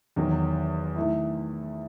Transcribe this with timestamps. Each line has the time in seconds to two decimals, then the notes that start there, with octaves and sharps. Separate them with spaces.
0.16 E2 D#3 F#3
0.96 D#3 A3 E4